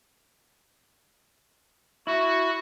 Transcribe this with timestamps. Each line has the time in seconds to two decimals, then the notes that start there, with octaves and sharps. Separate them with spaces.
2.07 E4 F#4